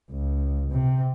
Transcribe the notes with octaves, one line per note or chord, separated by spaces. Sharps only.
C#2
C3